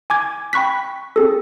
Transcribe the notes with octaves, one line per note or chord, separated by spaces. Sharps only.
G#5 D6 G#6
G5 B5 C#6 F#6 B6
C4 G#4 A4